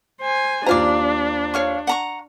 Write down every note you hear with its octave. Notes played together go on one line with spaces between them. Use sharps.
C5 G#5
D#2 D4 F4 C5 D5 F5 A#5
C#5 F5 C#6
F#5 A#5 C#6